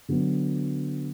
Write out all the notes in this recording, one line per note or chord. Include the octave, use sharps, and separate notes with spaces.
D3 F#3 B3